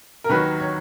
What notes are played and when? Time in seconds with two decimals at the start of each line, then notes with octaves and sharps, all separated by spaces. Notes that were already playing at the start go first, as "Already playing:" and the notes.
0.24 A#4
0.29 D#2 D#3 F#3 B4
0.60 C#5